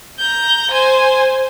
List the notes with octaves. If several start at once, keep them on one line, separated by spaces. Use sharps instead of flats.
A#5 G6
C5 G#5